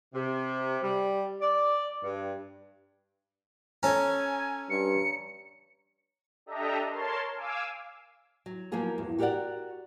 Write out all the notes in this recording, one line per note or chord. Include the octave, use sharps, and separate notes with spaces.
C3
G3
D5
G2
C#4 A4 C#5 G#5 A#5
G2 C#7
D4 G4 A4 D#5 E5 A#5
A#4 C#5 A5 C6
F5 G#5 D6 E6
F#3
F3 F#3 A#3 B3 G#4 A#4
E2 G2
F#4 G4 A#4 C5 D5 F#5